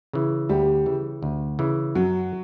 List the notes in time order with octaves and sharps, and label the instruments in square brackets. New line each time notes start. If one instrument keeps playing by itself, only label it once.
[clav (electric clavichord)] C#3 E3
[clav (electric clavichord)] D2 [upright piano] G3 G4
[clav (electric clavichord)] C#3 E3
D2
C#3 E3
[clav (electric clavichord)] F#2 [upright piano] F#3 F#4